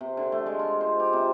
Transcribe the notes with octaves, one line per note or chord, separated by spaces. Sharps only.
C3
D3
A3
G#3
F4
C5
G4
C3